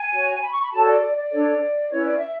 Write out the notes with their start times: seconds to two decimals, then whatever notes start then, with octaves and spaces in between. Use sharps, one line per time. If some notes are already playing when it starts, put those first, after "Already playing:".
Already playing: G#5
0.12 F#4 C#5
0.41 B5
0.52 C#6
0.61 B5
0.71 F#4 A4 C#5 A5
0.86 D5
1.01 D5
1.16 D5
1.30 D4 A4 C#5
1.90 C#4 E4 B4 C#5
2.04 D5
2.18 E5